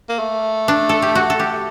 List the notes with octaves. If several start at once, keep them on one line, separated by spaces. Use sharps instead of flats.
A#3
A3
D4
A4
G4
F#4
A4
G4